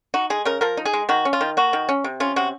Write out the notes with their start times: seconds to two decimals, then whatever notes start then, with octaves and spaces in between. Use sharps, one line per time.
0.14 D#4 F#4
0.30 G#3 G#4
0.45 C#3 A#4
0.61 F3 A#4
0.77 D#4
0.85 G#4
0.93 G#3
1.09 D#3 F#4
1.25 C#4
1.33 F4
1.41 D#3
1.57 A#3 F#4
1.73 D#3
1.89 C#4
2.04 C3
2.20 C#4 F4
2.36 C3 F#4